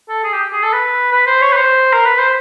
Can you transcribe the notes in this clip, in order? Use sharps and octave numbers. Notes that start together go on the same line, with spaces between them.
A4
G#4
G4
G#4
A4
B4
B4
C5
C#5
B4
C5
A#4
B4
C5